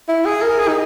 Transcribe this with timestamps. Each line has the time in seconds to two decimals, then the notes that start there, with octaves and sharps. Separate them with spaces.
0.08 E4
0.25 G#4
0.42 A#4
0.59 G#4
0.68 D#4